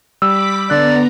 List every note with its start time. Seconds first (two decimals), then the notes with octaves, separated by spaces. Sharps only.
0.22 G3 B5 D6 E6 B6
0.70 D3 B3 D5 A#5 F#6